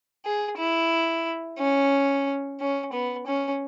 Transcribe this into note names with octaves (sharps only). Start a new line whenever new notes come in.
G#4
E4
C#4
C#4
B3
C#4